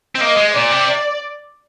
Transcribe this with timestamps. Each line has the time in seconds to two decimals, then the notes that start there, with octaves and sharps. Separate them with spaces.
0.15 C4
0.21 A#3 D#5
0.37 G#3
0.54 A#2 D5
0.71 C3